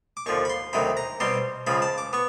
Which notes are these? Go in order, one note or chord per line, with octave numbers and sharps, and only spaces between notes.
D6
D#2 D3 F3 C#6
B5
C6
D2 C3 D#3 F#3 B5
A#5
B2 G3 C4 C6
C#2 C#3 F3 B5
A5
D6
B3 C#6